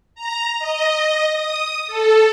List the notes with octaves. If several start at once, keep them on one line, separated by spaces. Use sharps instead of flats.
A#5
D#5
D#6
A4